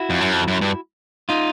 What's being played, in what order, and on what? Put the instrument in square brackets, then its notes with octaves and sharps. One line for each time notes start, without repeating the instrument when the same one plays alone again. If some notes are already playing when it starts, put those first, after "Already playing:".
Already playing: [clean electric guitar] E4 F#4
[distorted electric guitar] F2
F#2
F2
F#2
G2
[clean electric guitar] D#4 F4